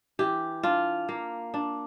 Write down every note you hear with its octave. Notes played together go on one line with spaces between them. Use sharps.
E3 G4
D4 F4
A#3
D4